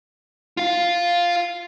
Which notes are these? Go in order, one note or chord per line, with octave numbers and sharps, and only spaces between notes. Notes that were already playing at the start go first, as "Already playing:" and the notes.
F4 F5